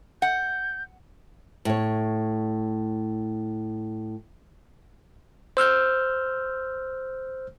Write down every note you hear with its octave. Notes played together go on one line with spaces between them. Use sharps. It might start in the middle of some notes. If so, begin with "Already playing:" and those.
F#5 G6
A2 C#5
C5 E6 F6 G6